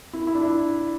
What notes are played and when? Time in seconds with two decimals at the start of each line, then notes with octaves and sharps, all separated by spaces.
0.13 E4
0.27 E4
0.35 D4
0.42 E4